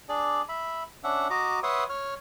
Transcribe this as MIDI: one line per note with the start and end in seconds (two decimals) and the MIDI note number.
0.09 0.42 62
0.09 0.42 68
0.09 0.42 74
0.49 0.83 76
0.49 0.83 83
1.04 1.28 61
1.04 1.28 62
1.04 1.28 76
1.04 1.28 78
1.30 1.60 66
1.30 1.60 75
1.30 1.60 82
1.30 1.60 86
1.63 1.84 71
1.63 1.84 73
1.63 1.84 76
1.63 1.84 78
1.63 1.84 84
1.63 1.84 87
1.89 2.14 73
1.89 2.14 89